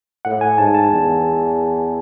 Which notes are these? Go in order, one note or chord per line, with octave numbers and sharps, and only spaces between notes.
A2 F#5
G#5
G#2 A5
A5
E2